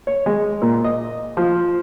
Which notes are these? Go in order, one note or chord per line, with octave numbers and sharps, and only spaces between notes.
C#5
G#3
A#2
D#5
F3